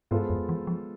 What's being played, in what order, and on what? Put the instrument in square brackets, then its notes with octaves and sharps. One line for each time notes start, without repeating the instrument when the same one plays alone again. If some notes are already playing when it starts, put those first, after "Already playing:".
[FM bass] G#2 [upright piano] G#3 B3 F4 A4 C5
[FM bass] F2
E3
F3